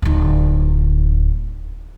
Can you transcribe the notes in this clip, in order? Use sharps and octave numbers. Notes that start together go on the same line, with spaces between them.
D1 D#4